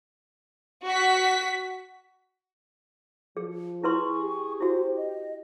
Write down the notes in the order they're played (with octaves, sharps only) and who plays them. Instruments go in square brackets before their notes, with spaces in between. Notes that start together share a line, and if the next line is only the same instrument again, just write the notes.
[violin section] F#4 B6
[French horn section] F3 [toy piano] G#4
[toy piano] E4 B4 C6 [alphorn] G#4 [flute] C#6
[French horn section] G4
[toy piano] E4 F#4 [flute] C5
[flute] D#5